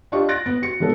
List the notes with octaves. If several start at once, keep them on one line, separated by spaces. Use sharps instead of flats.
D4 F4 G4 D#5 C#6
F#6 A6 A#6 D7
B3
F#4 C#7
E3 G#3 B3 A4